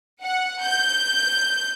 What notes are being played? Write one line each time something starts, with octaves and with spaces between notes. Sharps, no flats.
F#5
G6